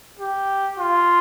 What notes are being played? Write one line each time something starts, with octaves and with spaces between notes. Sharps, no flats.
G4
F4